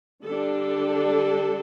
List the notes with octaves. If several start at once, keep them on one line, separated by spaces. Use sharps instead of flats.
D3 G3 D4 A4